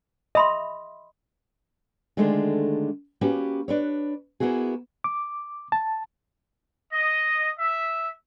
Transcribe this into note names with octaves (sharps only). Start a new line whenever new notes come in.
D#5 E5 B5 C6
D3 D#3 G#3 A3 D4
A#3 C#4 F#4 G4 B4
D4 B4 C#5
A#3 B3 E4 F#4 G#4
D6
A5
D#5
E5